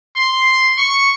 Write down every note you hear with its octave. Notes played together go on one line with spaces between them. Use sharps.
C6
C#6